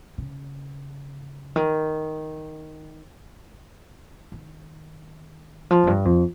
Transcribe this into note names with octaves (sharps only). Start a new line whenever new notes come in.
C#3
D#3
D#3
F3
F2
G2
F2